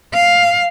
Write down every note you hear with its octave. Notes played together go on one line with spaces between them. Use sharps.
F5